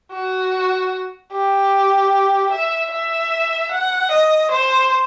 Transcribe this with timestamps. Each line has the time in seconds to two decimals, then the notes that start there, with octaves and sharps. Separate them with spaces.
0.12 F#4
1.32 G4
2.52 E5
2.91 E5
3.71 F#5
4.11 D#5
4.51 C5